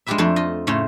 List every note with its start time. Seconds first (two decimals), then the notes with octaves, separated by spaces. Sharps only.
0.07 G#3 D4 F4 G4 B4 E5
0.18 F2 A3 D4 A4 C5 D5
0.36 F4 D#5
0.67 A2 C#3 A3 C#4 F4 C5